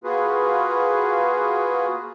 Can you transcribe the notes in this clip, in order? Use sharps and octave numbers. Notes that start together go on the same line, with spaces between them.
A#3 F4 F#4 G#4 B4